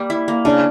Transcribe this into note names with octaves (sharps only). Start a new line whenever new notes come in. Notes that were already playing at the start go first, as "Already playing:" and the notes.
Already playing: G3 A#3
E4
A#3
C#3 D4